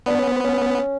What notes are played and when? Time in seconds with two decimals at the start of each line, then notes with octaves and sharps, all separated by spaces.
0.06 B3 D4
0.20 C#4
0.31 C4
0.44 C#4